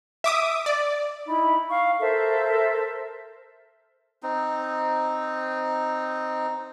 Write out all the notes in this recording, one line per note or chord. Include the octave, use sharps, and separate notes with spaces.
E5 D6 D#6
D5
D#4 E4 B5
F5 C#6
A4 A#4 C5 E5
C4 D#4